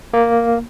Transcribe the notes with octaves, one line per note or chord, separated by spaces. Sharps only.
A#3